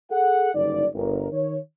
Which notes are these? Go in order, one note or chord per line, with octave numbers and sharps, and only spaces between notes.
G#4 A4 F#5
F#1 G2 D3 D#4 D5
G1 A#4
D#3 C#5